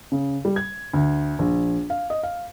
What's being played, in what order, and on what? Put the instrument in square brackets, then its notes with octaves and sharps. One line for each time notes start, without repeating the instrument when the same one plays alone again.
[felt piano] C#3
G3
G#6
D2
A#1
F5
D#5
F5